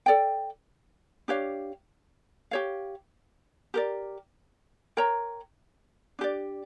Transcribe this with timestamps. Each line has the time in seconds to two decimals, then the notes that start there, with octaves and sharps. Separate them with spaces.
0.06 A4 D5 G5
1.28 D4 G4 C#5 F5
2.51 G4 C#5 F5
3.74 G4 A#4 D5
4.97 A#4 C#5 G5 A#5
6.19 D4 G4 D5